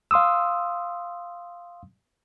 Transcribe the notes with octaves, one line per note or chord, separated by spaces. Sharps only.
F5 C6 D#6 E6